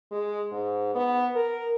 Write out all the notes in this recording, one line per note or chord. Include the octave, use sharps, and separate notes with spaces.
G#3
G#2
B3
A#4